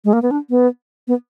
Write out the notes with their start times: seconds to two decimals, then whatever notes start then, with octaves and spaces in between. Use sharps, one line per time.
0.05 G#3
0.13 A#3
0.22 B3
0.31 D4
0.50 B3
1.08 B3